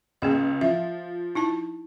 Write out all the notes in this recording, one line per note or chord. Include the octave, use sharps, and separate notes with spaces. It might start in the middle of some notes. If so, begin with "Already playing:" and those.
C#2 A#3 G#4 D#5
F3 E5
D#4 E4 A5